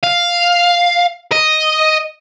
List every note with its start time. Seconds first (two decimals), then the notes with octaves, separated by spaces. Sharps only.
0.03 F5
1.32 D#5